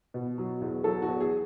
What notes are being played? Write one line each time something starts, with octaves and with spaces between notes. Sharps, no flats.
B2
F#3
E2
F#3 A4
F#4
E2
G#4